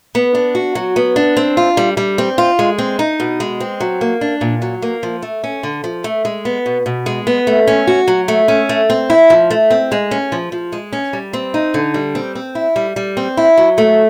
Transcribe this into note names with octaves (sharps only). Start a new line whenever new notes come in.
B3
D4
F#4
F#3
B3
D4
C4
F4
G3
G3
C4
F4
G#3
C4
D#4
B2
G#3
C4
F#3
A#3
D4
A#2
F#3
A#3
F3
A3
C#4
D3
F3
A3
G#3
B3
B2
B2
G#3
B3
A3
C#4
F#4
F#3
A3
C#4
A3
C4
E4
F3
A3
C4
G#3
C#4
F3
F3
G#3
C#4
G3
C4
D#4
D3
G3
C4
C4
E4
G3
G3
C4
E4
F#3
A3